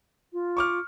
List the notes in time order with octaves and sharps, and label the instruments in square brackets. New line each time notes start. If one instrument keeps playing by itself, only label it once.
[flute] F4
[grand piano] C#6 D6 F6